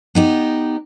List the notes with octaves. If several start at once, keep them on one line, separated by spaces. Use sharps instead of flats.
B3 D#4 G4